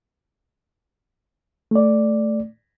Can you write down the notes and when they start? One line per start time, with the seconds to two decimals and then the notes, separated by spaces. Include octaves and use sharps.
1.71 A3 D5